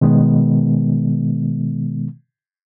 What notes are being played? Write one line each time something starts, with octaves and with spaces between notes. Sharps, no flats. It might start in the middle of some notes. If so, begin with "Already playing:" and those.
B2 D#3 G#3 B3